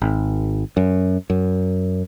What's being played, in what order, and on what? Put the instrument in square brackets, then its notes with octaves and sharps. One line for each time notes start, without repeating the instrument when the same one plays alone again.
[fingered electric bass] G#1
F#2
F#2